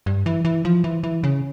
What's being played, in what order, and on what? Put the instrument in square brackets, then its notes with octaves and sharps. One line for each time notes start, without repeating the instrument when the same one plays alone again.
[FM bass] G2
E3
E3
F3
E3
E3
C#3